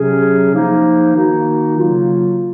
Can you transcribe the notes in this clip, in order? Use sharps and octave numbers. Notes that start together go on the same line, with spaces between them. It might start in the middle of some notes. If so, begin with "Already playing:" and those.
Already playing: C3 F#3 C#4 G#4
F3 A#3 D#4
D#3 A#3 D#4 F#4
C#3 F#3 A#3 F4